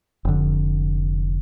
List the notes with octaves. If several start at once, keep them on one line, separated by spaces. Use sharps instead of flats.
F1 D3